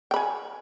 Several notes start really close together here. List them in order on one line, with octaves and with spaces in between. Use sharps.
G5 B5 G#5